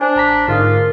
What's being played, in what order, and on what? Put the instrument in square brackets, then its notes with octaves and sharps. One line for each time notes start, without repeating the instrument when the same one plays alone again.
[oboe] D4 [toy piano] C5 D5 G#5
[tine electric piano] A1 A#5 B6
[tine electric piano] G#2 D3 G#3 [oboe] F4 [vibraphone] A#4 [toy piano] D#5 F5 D#6